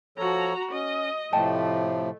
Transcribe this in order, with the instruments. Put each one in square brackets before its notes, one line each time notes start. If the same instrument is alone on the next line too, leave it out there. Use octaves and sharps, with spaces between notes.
[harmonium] F3 A4 C#5 [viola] F#4 A#5
[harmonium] C#4 [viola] D#5
[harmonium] A2 C3 F3 [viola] A3 [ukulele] D#5 G5 A5